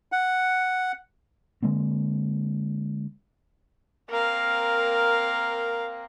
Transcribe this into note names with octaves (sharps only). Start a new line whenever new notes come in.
F#5
D3 G#3 A#3 C4
A#3 C4 A#4 F5